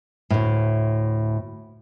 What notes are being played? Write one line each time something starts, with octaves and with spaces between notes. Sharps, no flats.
D2 A2